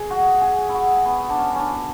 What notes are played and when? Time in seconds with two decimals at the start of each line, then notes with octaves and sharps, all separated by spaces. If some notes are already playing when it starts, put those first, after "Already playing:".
Already playing: G#4
0.11 F#4
0.42 G#4
0.69 E4 F#4
1.05 B3
1.30 D4
1.39 C#4
1.55 C#4 D4